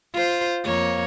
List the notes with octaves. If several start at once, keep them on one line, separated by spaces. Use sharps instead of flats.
F4 C5
F2 A#3 C#5